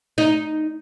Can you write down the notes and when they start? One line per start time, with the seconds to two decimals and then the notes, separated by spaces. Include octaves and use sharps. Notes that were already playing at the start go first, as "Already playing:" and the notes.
0.18 D#4